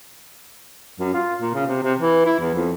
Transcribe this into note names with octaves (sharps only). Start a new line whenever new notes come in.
F#2
F4
A#2
C#3
C3
C3
E3
E4
E2
F2